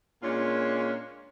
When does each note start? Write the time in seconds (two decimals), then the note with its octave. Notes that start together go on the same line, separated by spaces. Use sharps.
0.23 A#2 G#3 A#3 C#4 D4 F4